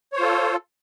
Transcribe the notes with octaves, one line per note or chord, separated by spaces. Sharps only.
F4 A4 C5 C#5